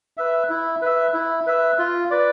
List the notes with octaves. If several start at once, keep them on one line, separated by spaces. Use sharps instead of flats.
B4 E5
E4
B4 E5
E4
B4 E5
F4
B4 D5